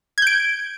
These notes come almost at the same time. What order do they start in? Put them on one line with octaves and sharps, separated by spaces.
G#6 G6 D7